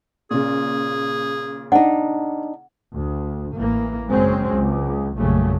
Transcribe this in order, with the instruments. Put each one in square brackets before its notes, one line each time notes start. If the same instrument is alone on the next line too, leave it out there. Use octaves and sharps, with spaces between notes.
[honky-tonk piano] A#2 C#3 [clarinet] G#4
[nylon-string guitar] D4 D#4 [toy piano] F#5
[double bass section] D2
A1 E3 A#3
F#1 F#3 G#3 C4 C#4
C#2
A#1 F#2 C#3 F#3 G3 A3